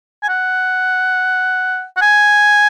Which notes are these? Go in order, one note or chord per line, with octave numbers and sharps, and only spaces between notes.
G#5
F#5
F#5
G#5